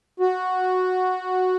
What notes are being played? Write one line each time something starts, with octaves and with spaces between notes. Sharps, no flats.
F#4